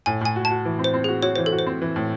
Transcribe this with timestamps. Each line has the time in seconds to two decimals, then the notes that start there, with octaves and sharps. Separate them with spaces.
0.06 A2 G#5
0.21 A2 G#5
0.36 F#4
0.45 A5
0.51 F#4
0.65 E3
0.79 C4
0.84 C5
0.94 C4
1.04 G#4
1.09 F#4
1.22 F#4 C#5
1.36 E3 C5
1.46 A4
1.52 F#4
1.59 C5
1.66 C4
1.82 E3
1.96 A2